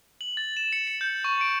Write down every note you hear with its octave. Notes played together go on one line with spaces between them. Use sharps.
F#7
A6
E7
C#7
C#7
G6
C#6
D7